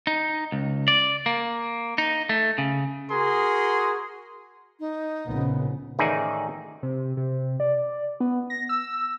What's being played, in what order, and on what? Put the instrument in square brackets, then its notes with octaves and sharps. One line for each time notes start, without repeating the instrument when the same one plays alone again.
[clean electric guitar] D#4
C#2
D5
A#3
D#4
A3
C#3
[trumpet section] F#4 G#4 A#4 C6
[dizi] D#4
[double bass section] A#1 C#3 B3
[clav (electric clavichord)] A1 D#3 D#4 G#4 D5 E5
[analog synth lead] C3
C3
D5
B3
A#6
E6